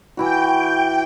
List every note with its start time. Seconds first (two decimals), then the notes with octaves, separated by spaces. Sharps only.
0.17 E3 E4 F#4 G5